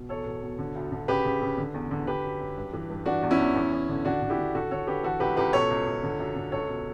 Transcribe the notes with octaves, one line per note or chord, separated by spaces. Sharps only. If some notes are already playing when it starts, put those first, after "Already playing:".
Already playing: B2
E2 A4 C#5
B2
B2
D3
D2
D3
C#3 G4 B4
C#3
C#3
D3
E2
D3
D3 G4 B4
F#2
F#2
G2
E3
G2
E3 D4 F#4
E2
C#4 E4
E2
E2
E2
D3
D3 D4 F#4
D3
E4 G4
D3
D3 F#4 A4
D3 A4 C#5
D3 G4 B4
E3 F#4 A4
C#2 G4 B4
C#2 G4 B4
B2 A4 C#5
C#2
C#2
D3
F#2
D3
C#2 A4 C#5
B2